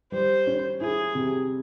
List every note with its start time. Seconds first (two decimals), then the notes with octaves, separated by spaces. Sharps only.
0.12 G3 C5
0.47 C#4
0.81 E4 G#4
1.15 C3